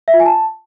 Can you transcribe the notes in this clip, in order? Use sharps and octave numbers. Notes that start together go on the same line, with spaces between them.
E5
F4
G#5
A5